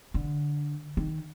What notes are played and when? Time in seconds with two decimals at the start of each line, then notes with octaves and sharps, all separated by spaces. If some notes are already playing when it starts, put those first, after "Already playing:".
0.14 D3
0.97 D#3